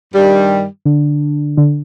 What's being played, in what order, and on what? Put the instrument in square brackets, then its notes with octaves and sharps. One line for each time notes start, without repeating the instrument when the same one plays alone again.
[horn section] G2 D#3 G3
[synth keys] D3 D4
D3 D4